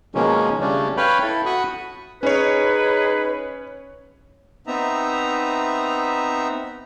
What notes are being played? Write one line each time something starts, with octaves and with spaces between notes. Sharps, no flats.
B2 D#3 F3 G#3 A#3 C#4
C#3 G3 A3 C#4 D4
B4 C#5 F5 G5 B5
E4 A4
F#4 B5 C#6 D#6
C#4 D#4 G#4 B4 C#5
B3 C4 D#4 E5 A#5